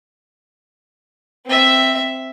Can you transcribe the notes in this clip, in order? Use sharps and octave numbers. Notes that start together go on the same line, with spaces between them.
C4 E5